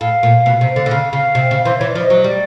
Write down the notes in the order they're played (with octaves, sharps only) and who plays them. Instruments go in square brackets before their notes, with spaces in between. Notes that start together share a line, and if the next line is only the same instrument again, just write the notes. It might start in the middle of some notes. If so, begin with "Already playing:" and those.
[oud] A2 [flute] F5
[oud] A#2
B2
C3
D3
D3
[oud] C#3 [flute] F5
[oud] C#3 [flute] F5
[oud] C3
C#3
[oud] E3 [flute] C5
[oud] E3 [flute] C#5
[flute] D5
[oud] F3
[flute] D#5
[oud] F#3
[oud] G3 [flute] D5